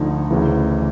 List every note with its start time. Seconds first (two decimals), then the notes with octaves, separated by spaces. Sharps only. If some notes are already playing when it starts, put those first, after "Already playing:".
Already playing: D2 D3 F3 D#4
0.31 D2 C#3 E3